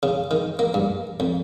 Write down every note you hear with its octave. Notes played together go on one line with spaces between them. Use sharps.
C#3
D#3
A#3
G2
F2